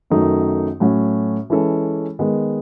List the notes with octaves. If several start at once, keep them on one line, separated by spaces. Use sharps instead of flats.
F#2 D#3 F#3 A3 D#4
A2 F#3 C#4 F#4
E3 G#3 C#4 E4 A4
D#3 G#3 B3